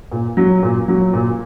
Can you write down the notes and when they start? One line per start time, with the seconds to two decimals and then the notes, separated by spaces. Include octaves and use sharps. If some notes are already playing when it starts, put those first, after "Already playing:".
0.12 A#2
0.37 F#3
0.63 A#2
0.88 F#3
1.13 A#2